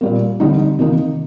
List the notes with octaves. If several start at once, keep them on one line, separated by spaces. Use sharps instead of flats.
A#2 G3 A#3
D3 G3 C4 D#4
C3 D#3 A#3 D#4